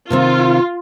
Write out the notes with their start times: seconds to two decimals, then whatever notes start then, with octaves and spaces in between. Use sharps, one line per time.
0.10 C3 D#3 C4 F4